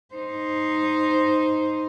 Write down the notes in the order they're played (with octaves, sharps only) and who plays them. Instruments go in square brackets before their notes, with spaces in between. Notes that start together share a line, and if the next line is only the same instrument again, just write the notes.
[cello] D#4 C5